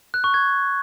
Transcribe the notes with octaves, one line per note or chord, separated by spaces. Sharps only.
F#6
C#6
G#6